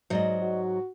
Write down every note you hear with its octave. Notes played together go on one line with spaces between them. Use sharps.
G#2 F#3 C5 D5 D#5
F#4